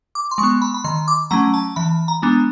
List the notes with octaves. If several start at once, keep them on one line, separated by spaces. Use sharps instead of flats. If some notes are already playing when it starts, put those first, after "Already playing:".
D6
C6
G#3 C#6
B3
B5
B5
D#3 C6
D6
F#3 A3 C#4 A#5
A5
E3 B5
A#5
G#3 B3 D4